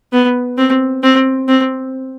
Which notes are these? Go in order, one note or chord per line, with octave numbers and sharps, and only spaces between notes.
B3
C4
C4
C4